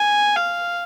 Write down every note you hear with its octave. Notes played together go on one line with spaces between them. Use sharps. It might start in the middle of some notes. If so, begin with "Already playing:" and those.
Already playing: G#5
F5